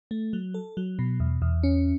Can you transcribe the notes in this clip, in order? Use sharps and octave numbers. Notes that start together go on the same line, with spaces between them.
A3
F#3
A4
F#3
B2
E2
E2
C#4